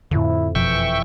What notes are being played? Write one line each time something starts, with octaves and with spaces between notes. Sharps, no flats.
F2 A2 D3 E4
F#1 B2 E3 F3 E5 G5 C#6